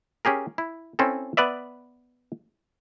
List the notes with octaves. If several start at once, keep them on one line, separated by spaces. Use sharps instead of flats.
C#4 G4 G#4 A#4
E4
C4 C#4 E4 A4
B3 B4 D5 E5